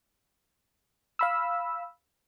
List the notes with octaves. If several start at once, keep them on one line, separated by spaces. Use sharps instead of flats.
F5 B5 E6